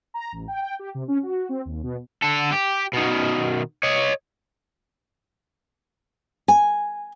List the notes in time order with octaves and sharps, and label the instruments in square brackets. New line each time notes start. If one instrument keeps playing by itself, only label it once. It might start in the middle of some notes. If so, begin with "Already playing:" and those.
[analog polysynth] A#5
A1
G5
G5
G4
C3
C#4
F#4
C4
D#2
B2
[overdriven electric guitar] D3 A4
G4
B2 D#3
C#5 D#5
[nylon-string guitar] G#5